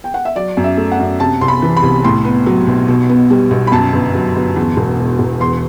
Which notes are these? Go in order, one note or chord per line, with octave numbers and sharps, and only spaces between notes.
G5
F#5
E5
F#3 D5
F#2
E5
A3
F#5
F#2
C3 A5
C2 C6
B5
E3
B5
C2
A2 C6
B3
F#3
B1
B2
B3
G3
B1
B5
F#2 A5
G1
F#3
G1
E2
E1
B2
E1
E2 C6